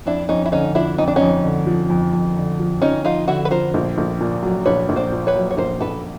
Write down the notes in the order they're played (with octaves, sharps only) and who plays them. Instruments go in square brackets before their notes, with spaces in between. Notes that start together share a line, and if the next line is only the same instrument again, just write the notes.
[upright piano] F2 [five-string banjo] D4 E4
[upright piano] F2 [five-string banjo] C#4 D#4
[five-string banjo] E4
[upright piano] D3 [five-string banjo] C#4 D#4
[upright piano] F3 [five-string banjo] D4 E4
[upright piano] F2 [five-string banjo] D#4
[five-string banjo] D4
C#4 D#4
[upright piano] F2
D3
F3
F2
F2
D3
F3
[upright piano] F2 [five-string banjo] C#4 D#4
[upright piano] F2 [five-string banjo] D#4 F4
[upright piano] D3 [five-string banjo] E4 F#4
[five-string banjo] B4
[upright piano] F3 [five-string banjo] A#4 C5
[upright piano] A#1
A#1
A#2
F#3
[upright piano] A#1 [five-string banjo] B4 C#5
[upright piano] A#1
[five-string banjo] C5 D5
[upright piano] A#2
[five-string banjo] B4 C#5
[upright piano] F#3
[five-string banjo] C#5
[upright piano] A#1 [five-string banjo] A#4 C5
[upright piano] A#1 [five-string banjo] A4 B4